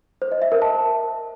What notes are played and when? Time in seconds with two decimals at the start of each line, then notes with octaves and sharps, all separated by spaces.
0.22 C5
0.32 D#5
0.42 E5
0.52 A#4
0.62 A5